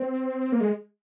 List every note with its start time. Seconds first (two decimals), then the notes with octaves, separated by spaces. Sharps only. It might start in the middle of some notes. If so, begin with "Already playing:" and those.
Already playing: C4
0.52 A#3
0.61 G#3